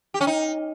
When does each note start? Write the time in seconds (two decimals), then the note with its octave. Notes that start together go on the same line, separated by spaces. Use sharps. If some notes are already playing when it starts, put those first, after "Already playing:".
0.14 G4
0.21 C#4
0.27 D#4